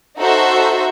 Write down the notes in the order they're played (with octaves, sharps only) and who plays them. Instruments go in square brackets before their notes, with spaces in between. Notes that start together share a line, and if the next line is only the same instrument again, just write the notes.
[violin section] D#4 F#4 A4 C5 E5